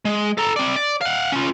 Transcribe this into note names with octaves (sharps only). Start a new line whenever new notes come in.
G#3
A4 A#5
C4 D5
D5
F5 F#5
C#4 F4